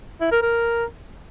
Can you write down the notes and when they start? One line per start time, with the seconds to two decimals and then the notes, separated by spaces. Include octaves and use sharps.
0.21 E4
0.31 A#4
0.42 A#4